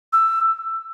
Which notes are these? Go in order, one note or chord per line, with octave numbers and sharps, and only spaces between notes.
E6